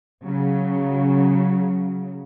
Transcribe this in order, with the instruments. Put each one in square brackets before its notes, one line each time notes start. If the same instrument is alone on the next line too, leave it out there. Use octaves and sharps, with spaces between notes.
[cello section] C#3 F#3